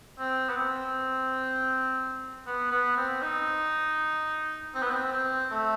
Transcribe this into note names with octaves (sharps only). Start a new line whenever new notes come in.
C4
B3
C4
B3
B3
C4
D#4
C4
B3
C4
C4
A3